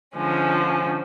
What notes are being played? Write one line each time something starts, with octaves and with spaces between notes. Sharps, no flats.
D3 F3 G#3 C#4